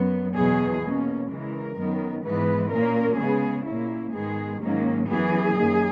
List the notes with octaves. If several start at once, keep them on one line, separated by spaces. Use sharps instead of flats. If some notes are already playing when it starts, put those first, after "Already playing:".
Already playing: F#2 B3
E2 B2 F#3 B3 G#4
B2 A#3 C#4
C#3 E3 G#3 A#4
F#2 D#3 F#3 B3
G#2 E3 G#3 B3 B4
A#2 A#3 C#4 A#4
C#3 G#3 B3 G#4
A#2 A#3 C#4 E4
G#2 D#3 G#3 B3 G#4
G#2 D#3 F#3 A#3 C#4
F#2 E3 B3 G#4
F#2 D#3 A#3